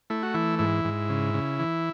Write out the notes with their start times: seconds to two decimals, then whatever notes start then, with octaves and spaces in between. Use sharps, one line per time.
0.10 A3 E4
0.23 F#4
0.34 E3 E4
0.59 G#2 E4
0.85 G#2
1.10 C#3
1.34 C#3
1.59 E3